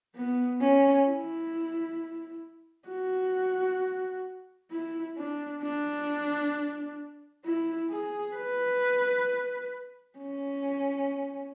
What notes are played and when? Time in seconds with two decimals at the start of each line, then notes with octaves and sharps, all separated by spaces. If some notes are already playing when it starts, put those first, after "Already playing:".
0.15 B3
0.61 C#4
1.07 E4
2.89 F#4
4.72 E4
5.18 D4
5.63 D4
7.45 E4
7.91 G#4
8.36 B4
10.18 C#4